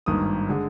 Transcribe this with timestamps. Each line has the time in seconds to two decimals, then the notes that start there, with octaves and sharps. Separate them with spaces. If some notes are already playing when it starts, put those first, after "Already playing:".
0.06 G#1 G2 D#3 A#3 D#6
0.49 D3 G#3